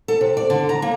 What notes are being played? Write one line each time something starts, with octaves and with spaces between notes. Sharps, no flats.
A4
C3
D5
D3
A#5
A#3